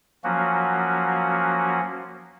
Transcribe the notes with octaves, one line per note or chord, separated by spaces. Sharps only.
F3 F#3 A#3 C#4 F#4